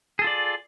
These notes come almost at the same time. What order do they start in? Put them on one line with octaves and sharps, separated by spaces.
G#4 A4 F4 D5